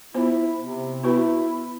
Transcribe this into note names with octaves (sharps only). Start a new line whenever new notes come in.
B3 E4 F4 C5
C3
B3 E4 F#4 B4